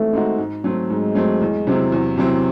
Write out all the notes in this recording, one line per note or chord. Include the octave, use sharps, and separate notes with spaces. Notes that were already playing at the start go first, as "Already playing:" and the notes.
Already playing: E3 G#3 A3 C4 D#4 F#4
G#3 C4 D#4 F#4
G#2
F#3 A3 C4
G#2 G#3
F#3 A3 C4
E2
C3 F#3 C4 E4
E2
C3 F#3 C4 E4